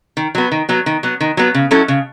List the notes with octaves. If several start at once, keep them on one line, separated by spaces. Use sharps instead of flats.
D#3
F#3 B3
D#3
F#3 B3
D#3
F#3 B3
D#3
F#3 B3
C#3
F#3 C#4 E4 A4
C#3